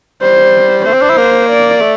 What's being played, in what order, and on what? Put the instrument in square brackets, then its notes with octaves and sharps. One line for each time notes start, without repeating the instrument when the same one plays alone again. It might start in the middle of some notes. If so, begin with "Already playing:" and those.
[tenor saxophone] G3 [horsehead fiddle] C5
[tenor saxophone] A3 [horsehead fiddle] C5
[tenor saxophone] C4
D4
E4
A#3
[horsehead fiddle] D5
[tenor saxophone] A3